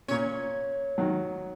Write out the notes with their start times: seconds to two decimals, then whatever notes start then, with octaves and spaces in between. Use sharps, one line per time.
0.08 A#2 C#4 C#5
0.98 D#3 F#3